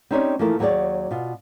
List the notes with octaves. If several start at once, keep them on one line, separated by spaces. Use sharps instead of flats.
C4 C#4 D#4 G4 C#5 D5
E3 F3 A3 A#3 A4 A#4
D#2 F#3 G#4 A4 C#5 D5
B2 F4